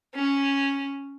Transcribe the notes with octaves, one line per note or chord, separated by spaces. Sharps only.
C#4